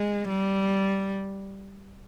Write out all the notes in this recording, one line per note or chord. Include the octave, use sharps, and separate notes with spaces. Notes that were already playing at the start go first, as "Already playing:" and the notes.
Already playing: G#3
G3